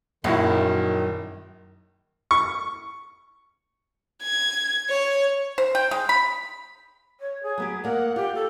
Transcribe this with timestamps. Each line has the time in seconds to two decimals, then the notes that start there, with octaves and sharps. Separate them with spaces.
0.24 A#1 F#2 D#3 E4
2.31 C#6
4.23 G#6
4.89 C#5
5.58 C5
5.75 G5
5.91 G#3
6.09 B5
7.20 C#5
7.43 G#4
7.58 F#3 B3 G4
7.84 A#3 D5 F#5
8.16 F4 G4
8.35 A4